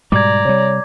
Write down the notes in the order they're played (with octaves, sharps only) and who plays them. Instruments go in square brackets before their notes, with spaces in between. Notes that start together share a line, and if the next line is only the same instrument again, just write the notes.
[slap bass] G#2 B2 G3 [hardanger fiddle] D5 A#5 [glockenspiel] D6 G#6
[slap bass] C3 G3 [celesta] C#5